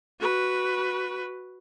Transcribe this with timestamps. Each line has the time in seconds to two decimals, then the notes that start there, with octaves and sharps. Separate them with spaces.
0.20 F#4 B4